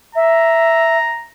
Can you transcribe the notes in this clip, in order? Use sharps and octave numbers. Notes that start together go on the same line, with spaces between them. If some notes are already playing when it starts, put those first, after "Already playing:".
E5 A#5